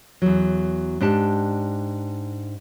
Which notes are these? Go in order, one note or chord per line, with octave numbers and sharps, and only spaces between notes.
E2 F#3
G#2 D4 G4 A5